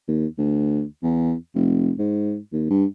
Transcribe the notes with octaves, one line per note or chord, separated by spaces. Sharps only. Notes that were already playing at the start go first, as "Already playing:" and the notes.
D#2
D2
E2
F1
G#2
D#2
G2